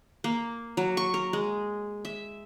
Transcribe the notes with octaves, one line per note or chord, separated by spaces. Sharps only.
A#3
F#3
C#6
A#4
G#3
E5